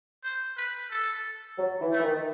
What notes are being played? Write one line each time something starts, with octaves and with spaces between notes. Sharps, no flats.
C5
B4
A4
F#3
E3
A3
E3
D#3